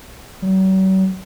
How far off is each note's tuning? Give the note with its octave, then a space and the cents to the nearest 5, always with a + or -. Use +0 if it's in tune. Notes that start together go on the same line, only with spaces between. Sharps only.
F#3 +45